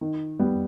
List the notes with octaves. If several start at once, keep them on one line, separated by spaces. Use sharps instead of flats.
D#3
G3 B3